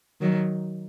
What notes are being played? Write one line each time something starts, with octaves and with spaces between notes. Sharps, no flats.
D#3 F#3